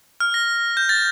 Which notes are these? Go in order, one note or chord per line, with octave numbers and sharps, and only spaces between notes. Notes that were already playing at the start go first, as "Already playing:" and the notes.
F6
A#6
G6
A6